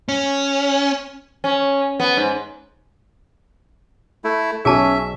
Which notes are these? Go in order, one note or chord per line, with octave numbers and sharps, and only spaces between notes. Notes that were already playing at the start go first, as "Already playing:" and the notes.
C#4
C#4
B3
G#2
A3 E4
B1 C#4 G#4 E5 A5